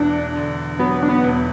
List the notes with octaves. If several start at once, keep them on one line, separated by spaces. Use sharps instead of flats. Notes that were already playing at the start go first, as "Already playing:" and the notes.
Already playing: E1 E2 D4
D3
F#3 B3
D4
B3
E1